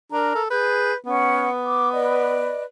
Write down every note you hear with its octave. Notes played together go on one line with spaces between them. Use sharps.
D4 A#4 A#5
A4
G#4 B4 G6
B3 C#4 F#5
D6
B4 D5 D#5